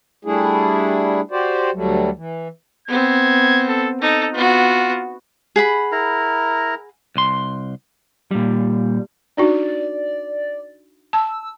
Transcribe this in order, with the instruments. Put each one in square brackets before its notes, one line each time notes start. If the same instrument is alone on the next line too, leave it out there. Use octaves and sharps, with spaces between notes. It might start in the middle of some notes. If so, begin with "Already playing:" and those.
[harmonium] G3 A3 D4 E4 G#4
F#4 G4 C5 D5
D2 F#3 G3 A3
E3
[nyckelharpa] B3 C4 [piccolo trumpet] G#6
[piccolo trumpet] A4
[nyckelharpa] D#4 [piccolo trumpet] A4
[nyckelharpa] B3 F#4 [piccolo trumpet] F4
[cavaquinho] G#4 F#5 B5
[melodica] E4 A#4 A#5
[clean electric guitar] C2 C6
A#2 G3
[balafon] D4 D#4 F#4 [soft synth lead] D5
[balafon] A5 [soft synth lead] E6